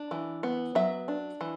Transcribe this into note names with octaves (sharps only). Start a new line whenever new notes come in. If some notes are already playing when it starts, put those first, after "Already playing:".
Already playing: D4
E3
B3
F#3 E5
D4
E3